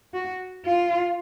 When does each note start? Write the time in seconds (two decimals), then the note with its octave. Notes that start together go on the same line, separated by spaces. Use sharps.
0.14 F#4
0.65 F4